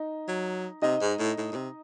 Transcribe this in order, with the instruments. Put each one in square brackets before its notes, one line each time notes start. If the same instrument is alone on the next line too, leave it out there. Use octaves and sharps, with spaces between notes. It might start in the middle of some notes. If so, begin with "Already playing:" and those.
Already playing: [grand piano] D#4
[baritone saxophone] F#3
[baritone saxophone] C3 [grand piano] D#4 D#5
[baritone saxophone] G#2
A2
A2
A2
C3